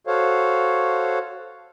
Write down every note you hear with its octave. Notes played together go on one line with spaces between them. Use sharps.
F#4 A4 C5 C#5 F5